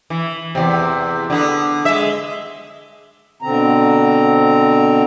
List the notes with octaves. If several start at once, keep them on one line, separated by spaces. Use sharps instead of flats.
E3
E2 C3
D3 B3
G#3 E5
B2 D3 C4 A#5